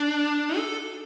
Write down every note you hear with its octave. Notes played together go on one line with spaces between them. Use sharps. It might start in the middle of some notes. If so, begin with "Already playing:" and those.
Already playing: D4
A4